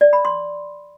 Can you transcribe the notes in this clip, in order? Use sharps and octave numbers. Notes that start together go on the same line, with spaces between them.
D5
B5
C6